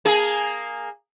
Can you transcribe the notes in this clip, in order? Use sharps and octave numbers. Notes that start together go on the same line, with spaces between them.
A#3 G#4